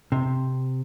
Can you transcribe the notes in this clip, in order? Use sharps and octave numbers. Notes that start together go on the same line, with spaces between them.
C3